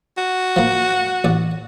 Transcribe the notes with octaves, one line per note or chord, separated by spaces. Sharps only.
F#4
F3 A#3
A1 D5